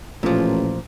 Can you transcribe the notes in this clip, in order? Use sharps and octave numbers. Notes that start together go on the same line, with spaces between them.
A1 A#2 F3